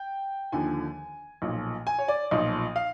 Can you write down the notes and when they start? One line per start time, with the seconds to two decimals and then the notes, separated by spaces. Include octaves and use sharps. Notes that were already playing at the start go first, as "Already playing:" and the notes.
Already playing: G5
0.52 D#2 D3 F3 G#5
1.42 B1 A#2 F3
1.87 G#5
1.99 C#5
2.08 D5
2.31 B1 A#2 F3 D#5
2.76 F5